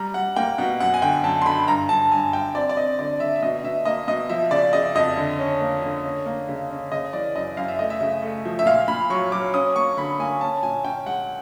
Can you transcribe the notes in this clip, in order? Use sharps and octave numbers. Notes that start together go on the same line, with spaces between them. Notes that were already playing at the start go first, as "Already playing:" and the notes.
Already playing: G3 A#5
G3 F#5
A#3 G5
B2 F#5
F#2 F#5
G#5
D3 G5
F#2 A5
C6
D3 B5
G2 A#5
G2 A5
G2 G#5
G2 G5
C4 D5
D5
C4 D#5
D3 D5
D3 E5
E5
B2 D#5
B2 E5
A#3 D#5
B2 D#5
F3 E5
C#3 D5
C#3 D#5
F2 D#5
D3
C#4
A#3
D3
C#4
A#3
C#3
C#4
C#3 D#5
E3 D5
F#2 D#5
F#2 F5
E5
A3 D#5
E5
C#3
A3
F3
E5
A#2 F5
A#2 B5
F#3 C#6
F#3 D6
C#4 D#6
A#3 C#6
D3 B5
A#3 G#5
C#4 A5
A#2 G#5
C#4 G5
G#3 F#5